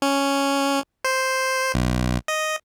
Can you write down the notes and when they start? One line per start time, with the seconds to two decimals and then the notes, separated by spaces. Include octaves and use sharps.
0.02 C#4
1.05 C5
1.74 B1
2.28 D#5